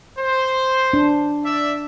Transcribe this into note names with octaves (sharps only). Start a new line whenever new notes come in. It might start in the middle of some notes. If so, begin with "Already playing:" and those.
C5
D4
D5 E5